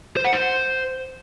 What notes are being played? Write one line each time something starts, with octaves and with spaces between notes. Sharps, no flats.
C5
F#5
C5